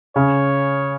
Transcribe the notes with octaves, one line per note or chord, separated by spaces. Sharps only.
C#3 C#5